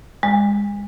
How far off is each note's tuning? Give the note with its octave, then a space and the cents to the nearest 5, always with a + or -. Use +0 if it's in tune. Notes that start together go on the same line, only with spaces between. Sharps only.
G#3 -30